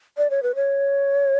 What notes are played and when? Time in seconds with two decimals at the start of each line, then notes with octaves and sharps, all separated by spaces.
0.17 D5
0.30 C#5
0.43 B4
0.55 C#5